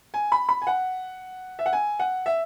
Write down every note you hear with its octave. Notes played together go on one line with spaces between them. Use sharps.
G#5
B5
B5
G#5
F#5
E5
F#5
G#5
F#5
E5